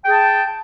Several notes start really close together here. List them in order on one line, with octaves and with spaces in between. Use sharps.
G5 G#4 A5